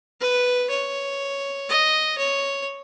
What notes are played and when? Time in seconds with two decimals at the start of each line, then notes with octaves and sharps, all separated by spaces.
0.20 B4
0.70 C#5
1.69 D#5
2.18 C#5